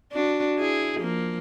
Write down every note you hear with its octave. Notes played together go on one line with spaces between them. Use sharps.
D4 F#4
E4 G#4
F3 A#3